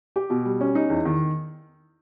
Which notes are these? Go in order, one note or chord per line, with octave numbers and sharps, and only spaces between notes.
G4
B2
G3
C#4
D#4
E2
D#3